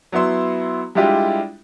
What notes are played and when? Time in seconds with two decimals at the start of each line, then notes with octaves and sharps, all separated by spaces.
0.12 F#3 B3 E4 C6 E6
0.95 G3 G#3 D4 E4 F4 G4